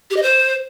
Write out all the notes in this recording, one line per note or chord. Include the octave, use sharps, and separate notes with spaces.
G4
D#5
C5